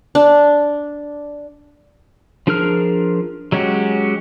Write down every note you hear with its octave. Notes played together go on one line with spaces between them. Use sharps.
D4
F3 D4 G#4 A#4 F6
F#3 G#3 C#4 F#4 G4